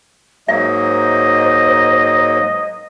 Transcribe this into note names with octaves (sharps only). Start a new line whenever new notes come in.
G#2 F#3 A#3 C5 D#5 E5